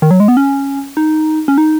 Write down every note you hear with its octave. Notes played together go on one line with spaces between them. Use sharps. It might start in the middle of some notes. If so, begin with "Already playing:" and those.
D#3
F#3
G#3
B3
C#4
D#4
C#4
D#4